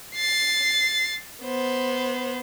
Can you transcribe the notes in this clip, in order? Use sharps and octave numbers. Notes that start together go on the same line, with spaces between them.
A6 C7
B3 C5